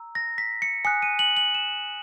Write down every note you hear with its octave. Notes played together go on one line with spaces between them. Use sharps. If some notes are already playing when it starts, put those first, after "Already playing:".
Already playing: A#5 E6
A#6
B6
C#7
G#5 D#6 F#6 C#7
D#7
F#7
F#7
E7